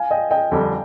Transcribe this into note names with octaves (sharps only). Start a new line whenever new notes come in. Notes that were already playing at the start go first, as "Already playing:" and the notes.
Already playing: F5 G#5
D#5 G5
D#5 G5
F2 D3 G3